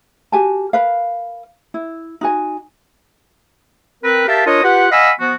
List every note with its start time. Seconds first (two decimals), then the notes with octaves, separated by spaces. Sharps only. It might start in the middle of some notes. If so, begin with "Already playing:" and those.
0.32 F#4 G4 G#5 A5
0.73 A#4 B4 F5
1.74 E4
2.21 D#4 F#4 G#5
4.03 C4 A#4 B4
4.27 G4 A#4 E5 F5 A5
4.46 D4 F4 A#4 C#5 D#5
4.63 F4 G4 B4 F#5
4.91 D#5 F5 F#5 G#5 B5 E6
5.20 F3 B3 F#4